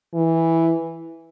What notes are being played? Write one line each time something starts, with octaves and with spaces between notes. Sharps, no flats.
E3